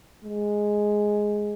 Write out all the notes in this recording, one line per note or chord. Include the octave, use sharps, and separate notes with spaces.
G#3